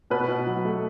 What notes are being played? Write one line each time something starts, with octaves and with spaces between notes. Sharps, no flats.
B2 B4
B2
F#3
A3